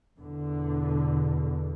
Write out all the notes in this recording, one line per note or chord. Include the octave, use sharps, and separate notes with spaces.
E2 B2 D3